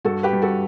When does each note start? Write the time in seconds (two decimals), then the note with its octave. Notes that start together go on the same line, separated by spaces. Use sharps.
0.05 G2 F#4 A4
0.23 G4 B4
0.33 G2
0.42 F#4 A4